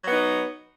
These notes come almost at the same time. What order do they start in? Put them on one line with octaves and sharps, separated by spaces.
F#3 B3 D#4